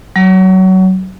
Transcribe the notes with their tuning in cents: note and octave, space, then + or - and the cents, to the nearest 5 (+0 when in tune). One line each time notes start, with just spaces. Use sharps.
F#3 +25